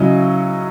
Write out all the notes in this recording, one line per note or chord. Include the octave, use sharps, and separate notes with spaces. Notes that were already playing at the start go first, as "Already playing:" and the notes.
Already playing: C#3 F#3 C#4 E4 D#5